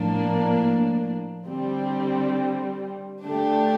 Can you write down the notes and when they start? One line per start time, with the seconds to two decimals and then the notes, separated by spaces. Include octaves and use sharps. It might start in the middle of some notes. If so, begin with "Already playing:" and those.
Already playing: A2 F3 A#3 D4
1.46 D3 G3 C4
3.23 D3 A3 D4 G4